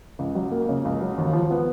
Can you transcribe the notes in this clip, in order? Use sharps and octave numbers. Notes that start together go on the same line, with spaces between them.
C#2
F#3
A#3
C#3
C#2
F#3
D#2
F3
B3